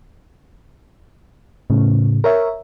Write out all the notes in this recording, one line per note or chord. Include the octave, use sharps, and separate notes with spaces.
A2 C#3
A#4 C#5 E5